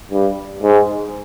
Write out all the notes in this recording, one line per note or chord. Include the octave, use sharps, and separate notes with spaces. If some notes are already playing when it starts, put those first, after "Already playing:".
G2
G#2